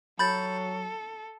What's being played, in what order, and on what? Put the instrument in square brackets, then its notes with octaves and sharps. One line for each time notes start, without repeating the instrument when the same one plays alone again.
[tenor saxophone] F#3 [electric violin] A4 [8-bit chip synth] B5 G6 A6